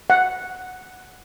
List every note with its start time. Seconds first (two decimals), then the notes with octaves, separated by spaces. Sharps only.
0.10 F#5